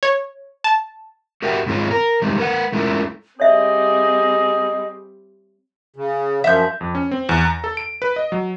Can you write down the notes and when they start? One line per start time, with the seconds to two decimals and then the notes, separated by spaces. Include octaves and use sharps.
0.03 C#5
0.64 A5
1.42 F#4 G4 A#4 E5 F#5 G5
1.67 G#2 D#3 C4 F4 G#4 C#5
1.91 A#4
2.22 D#3 G3 G#3 C4
2.38 A#4 B4 E5 F#5
2.72 G#3 A3 C#4 E4 F4 A#4
3.40 G3 C4 G#4 C#5 D#5 E5
5.96 C#3
6.44 F#2 F3 E5 G6
6.81 F2
6.95 C#4
7.11 C4
7.29 E2
7.45 A#5
7.64 A4
7.77 D7
8.02 B4
8.16 D#5
8.32 F#3